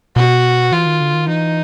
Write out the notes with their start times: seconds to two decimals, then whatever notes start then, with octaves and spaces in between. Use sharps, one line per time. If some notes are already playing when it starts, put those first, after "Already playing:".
0.16 B2 F#4
0.72 E3 F4
0.86 D#3
1.01 D3
1.14 D#3
1.28 E3 D#4